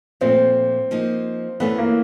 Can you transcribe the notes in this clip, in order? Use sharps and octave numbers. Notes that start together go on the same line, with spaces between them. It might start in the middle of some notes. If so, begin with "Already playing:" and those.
A#2 F3 A3 C4
F3 A#3 D#4
E3 A3 B3 C#4
A#3